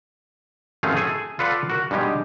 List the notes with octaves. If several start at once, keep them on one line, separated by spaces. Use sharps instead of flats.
A1 F#2 A3 C4 G#4 F5
G#4 A4 G#5
F4 A4 B4 D5 F5 F#5
F#4 A#4
G2 B2 G3 G#3 D#4 G4